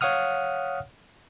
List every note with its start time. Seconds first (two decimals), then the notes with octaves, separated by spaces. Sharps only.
0.01 C#5 F5 F#5 D#6 F6